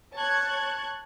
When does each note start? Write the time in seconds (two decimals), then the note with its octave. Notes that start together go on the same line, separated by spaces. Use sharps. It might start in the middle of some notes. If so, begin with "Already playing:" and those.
0.16 C#5 A5 C#6 F#6 G#6